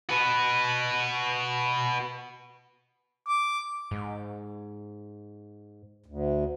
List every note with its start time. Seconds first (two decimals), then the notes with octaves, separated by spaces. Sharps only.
0.09 F#4 B4
3.26 D6
3.91 G#2
6.06 D2